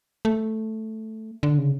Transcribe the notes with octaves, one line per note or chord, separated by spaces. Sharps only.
A3
D3
C#3